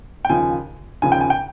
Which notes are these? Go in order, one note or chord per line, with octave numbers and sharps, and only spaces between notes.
G5
D#2 C#3 F3 G#5
D#2 C#3 F3 G#5
G5
G#5
G5